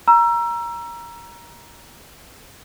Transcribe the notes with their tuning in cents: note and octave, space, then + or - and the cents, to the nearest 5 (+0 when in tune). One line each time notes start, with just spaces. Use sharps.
A#5 +15 E6 +30